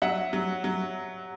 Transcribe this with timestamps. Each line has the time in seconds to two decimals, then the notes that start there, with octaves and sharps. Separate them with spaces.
0.02 F#3 E5 F#5
0.33 F#3
0.64 F#3